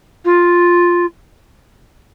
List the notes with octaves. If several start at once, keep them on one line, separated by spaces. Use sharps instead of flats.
F4